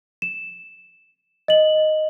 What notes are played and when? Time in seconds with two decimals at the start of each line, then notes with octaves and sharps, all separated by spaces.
0.22 E7
1.48 D#5 F#7